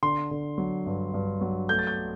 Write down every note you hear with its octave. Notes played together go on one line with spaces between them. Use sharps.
D3 C6
D3
F#3
G2
G2
F#3
A3 G6
A6
G6